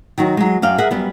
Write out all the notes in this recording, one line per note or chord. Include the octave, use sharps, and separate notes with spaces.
D#3 F#3 F#4
F#3 G#3
F#2 D5 F5 G5
G#4 A#4 E5 F#5
F#2 G3 B3